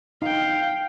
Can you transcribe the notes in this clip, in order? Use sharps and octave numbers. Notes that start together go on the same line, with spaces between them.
D#4 F5 G5